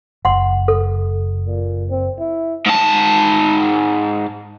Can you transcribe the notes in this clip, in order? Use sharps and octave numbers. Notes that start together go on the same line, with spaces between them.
F#1 F#5 C6
A4
A#2
C4
E4
G#2 A5